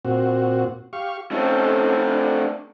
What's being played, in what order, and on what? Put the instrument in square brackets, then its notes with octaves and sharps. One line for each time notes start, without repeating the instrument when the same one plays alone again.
[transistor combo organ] A#2 C4 F#4
G4 F5 C#6
[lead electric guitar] A3 C4 [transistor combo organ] C#4 D#4 A4
[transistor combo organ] D4